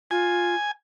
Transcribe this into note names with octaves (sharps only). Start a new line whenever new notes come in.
F4 G#5